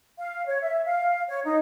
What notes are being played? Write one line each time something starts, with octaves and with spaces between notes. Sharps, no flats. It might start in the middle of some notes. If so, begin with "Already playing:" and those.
F5
C#5
E5
F5
C#5
D#4